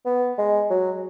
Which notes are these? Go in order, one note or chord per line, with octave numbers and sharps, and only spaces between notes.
B3
G#3
F#3